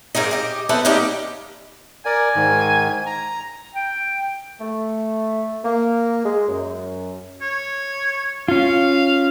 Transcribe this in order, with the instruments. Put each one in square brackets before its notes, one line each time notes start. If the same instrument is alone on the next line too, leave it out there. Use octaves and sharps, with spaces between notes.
[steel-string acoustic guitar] G#2 A#3 D#4 D#5
G4 D#5
B3 A4 B4 C5 E5 F#5
G3 A#3 D#4 G4 D5 F#5
[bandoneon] A#4 D5 [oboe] G#5
[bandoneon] G#2 D#3
A#5
[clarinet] G5
[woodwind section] A3
A#3
G#3
F#2
[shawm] C#5
[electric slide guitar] C#4 F4 [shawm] F5